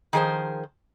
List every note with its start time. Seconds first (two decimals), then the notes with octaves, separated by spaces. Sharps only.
0.13 D#3 F3 G#4 A#4 C5